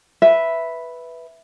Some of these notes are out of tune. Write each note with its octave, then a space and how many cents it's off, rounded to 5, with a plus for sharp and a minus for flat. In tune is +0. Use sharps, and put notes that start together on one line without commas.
B4 +0 E5 +0